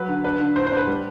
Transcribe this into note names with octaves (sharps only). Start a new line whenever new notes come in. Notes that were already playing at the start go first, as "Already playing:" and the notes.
Already playing: F#3 B4
D3
D4 B4
D3
A2 C5
C5
D4 B4
G3